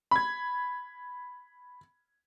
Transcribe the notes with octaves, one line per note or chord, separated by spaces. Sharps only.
B5 G#6